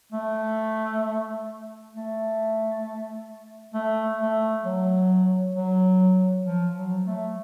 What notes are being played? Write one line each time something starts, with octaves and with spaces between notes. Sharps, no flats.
A3
A3
A3
A3
F#3
F#3
F3
F#3
A3